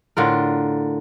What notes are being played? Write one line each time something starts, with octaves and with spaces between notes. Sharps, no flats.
A2 D3 F4 A#4